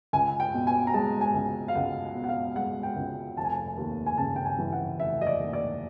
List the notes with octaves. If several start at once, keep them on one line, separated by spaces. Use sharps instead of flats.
C#2 G#5
G5
B2
G#5
A#5
G#3 A5
G#5
C#2
F5
C#2 F#5
B2
F#5
F5
G#3 F#5
G5
C#2
F1 A5
G#5
A5
D#2
G#5
C#3 A5
G5
G#5
E3
F#5
F1 E5
D#5
D5
D#2
D5